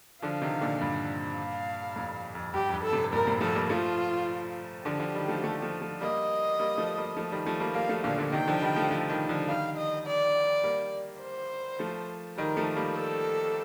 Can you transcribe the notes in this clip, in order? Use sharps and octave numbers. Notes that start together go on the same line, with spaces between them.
D3 F3 F5
C3 D#3
A#2 D3
G2 A#2
F5
F2 A2
F2
G2 G4
F2
G2
A4
A2 C3
G2 A#2 A#4
A2 C3
F3 A3 A4
G3 A#3
F3 A3 F4
D3 F3 G4
D3 F3
D#3 G3
F3 A3
F3 A3
F3 A3
F3 A3
G3 A#3 D#5
G3 A#3
F3 A3
G3 A#3
F3 A3
D#3 G3
F3 A3
G3 A#3
G3 A#3 F5
F3 A3
A#2 D3 F5
A#2 D3
C3 D#3 G5
D3 F3
D#3 G3
F3 A3
F3 A3
D#3 G3
D3 F3
D#3 G3 F5
D#5
D5
G3 A#3
C5
F3 A3
D#3 G3 A#4
F3 A3
G3 A#3
A4